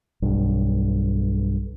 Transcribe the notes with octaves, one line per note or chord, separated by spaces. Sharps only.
B1 G2